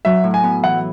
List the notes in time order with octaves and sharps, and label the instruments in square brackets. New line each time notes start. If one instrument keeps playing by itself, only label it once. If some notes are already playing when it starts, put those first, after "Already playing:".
[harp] F#3 [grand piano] E5
[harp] A2
[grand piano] G#5
[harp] B3
[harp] E3 [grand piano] F#5